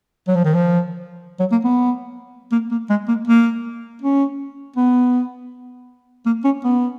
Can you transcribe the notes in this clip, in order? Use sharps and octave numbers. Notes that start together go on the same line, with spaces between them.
F#3
F3
D#3
F3
F#3
A#3
B3
A#3
A#3
G#3
A#3
A#3
C#4
B3
A#3
C#4
B3